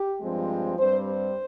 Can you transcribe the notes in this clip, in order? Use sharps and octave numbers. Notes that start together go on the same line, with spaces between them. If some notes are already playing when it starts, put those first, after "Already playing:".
Already playing: G4
G2 F3 G#3 C4
G2 G3 C4 C5
C5